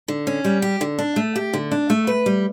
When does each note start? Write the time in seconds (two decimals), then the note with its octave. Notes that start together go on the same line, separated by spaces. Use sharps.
0.08 D3
0.27 C#4
0.45 G3
0.62 G4
0.81 D3
0.99 D4
1.16 A3
1.36 G4
1.54 D3
1.72 D4
1.90 A3
2.07 B4
2.26 G3